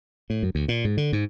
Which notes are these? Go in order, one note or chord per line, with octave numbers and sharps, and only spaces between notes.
A2
F#2
D2
A#2
G#2
D3
G#2